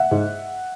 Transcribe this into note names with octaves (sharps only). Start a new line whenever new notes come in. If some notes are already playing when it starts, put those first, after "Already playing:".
Already playing: E5 F#5
G#2